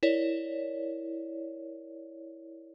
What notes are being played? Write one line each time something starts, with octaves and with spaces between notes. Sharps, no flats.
E4 A#4 C#5 D5